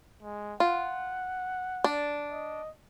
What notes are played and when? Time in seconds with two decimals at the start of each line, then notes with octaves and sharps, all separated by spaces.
0.22 G#3
0.60 F4 F#5
1.84 D4
2.32 D#5